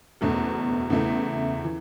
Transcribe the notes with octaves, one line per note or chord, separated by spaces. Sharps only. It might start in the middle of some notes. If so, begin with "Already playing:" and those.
F#1 E2 B2 A3
E2 C#3 E3 A3 E4
E3